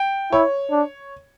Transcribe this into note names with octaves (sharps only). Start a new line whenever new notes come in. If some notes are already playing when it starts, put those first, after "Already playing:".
Already playing: G5
E4 C#5
D4